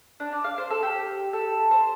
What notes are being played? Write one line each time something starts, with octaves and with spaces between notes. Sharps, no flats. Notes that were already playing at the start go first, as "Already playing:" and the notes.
D4
D5
F5
C5
A4
G4
A4
C5